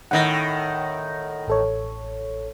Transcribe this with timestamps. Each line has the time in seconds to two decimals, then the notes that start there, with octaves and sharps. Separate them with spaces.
0.11 A2 D#3 F#5 A#6
1.48 A1 A4 C#5